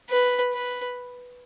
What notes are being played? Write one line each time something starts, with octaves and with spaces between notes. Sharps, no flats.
B4
B4